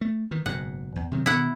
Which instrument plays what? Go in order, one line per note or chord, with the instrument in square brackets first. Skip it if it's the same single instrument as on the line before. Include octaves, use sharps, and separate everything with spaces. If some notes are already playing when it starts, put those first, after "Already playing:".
[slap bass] A3
D#3 E3
[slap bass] F#1 G#2 B2 [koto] F#5
[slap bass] E2
C3 D#3 F#3
[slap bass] B2 D#3 [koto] E4 F#5